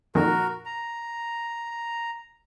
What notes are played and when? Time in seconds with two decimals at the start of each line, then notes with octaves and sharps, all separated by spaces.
0.15 F2 A#2 D#3 F#4 A#4
0.66 A#5